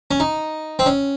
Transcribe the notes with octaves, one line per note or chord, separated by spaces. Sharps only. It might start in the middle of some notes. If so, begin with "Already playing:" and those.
C#4
D#4
C4
C#4